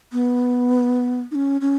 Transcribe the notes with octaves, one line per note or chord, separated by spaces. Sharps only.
B3
D#4
C#4
C#4